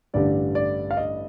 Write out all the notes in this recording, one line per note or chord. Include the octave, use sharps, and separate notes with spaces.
A1 G2 D3 G3 D5
D5
F5
D#5